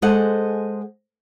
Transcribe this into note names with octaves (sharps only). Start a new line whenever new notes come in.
G#3 G#4 A4 C5 D#5 F#5